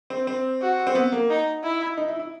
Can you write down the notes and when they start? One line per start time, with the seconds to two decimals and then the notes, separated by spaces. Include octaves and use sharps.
0.10 C4
0.27 C4
0.62 F#4
0.87 C4
0.95 B3
1.12 A#3
1.30 D#4
1.63 E4
1.97 D#4
2.08 E4
2.19 E4